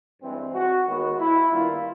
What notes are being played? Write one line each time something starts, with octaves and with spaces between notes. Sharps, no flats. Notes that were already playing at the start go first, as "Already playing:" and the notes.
G2 E3 G#3 C4
F#4
D#2 D#3 G#3 B3 F#4
E4
G2 D#3 G3 A#3 F4